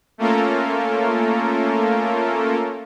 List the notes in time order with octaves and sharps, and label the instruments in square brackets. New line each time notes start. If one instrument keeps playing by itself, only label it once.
[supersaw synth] A3 A#3 C#4 F4 A4 A#4